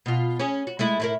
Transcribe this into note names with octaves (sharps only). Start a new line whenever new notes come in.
B2 F4
C#4 G#4
F#4
G#3 A3 E4
A2 E4 A#4